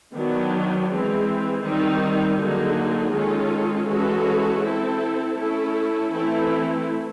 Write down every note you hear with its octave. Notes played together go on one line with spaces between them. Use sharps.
D#3 F#3 B3 D4
E3 G#3 C4
D#3 G3 C4 D#4
D3 F#3 A#3 D#4 G#4
D#3 G#3 C#4 F4 A4
E3 G#3 C#4 F#4 A4
C4 E4 A4
A3 C#4 E4 A4
E3 A3 C4 E4 A4